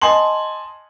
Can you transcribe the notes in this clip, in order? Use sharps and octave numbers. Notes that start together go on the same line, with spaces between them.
D#5 G#5 A5 C6 F#7